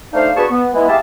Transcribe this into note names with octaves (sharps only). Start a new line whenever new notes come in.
A3 D4 D#4 C5 F5
B2 D4 G#4 B4 A5 C#6
B3
E3 G#3 B3 E4
G4 G#4 E5 F5 A5